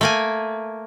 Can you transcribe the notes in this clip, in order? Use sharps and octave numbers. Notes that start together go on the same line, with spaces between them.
A3 A#3 G#5